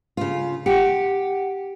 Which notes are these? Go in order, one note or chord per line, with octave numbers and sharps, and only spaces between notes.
C#3 F4
G4 F#5 C#7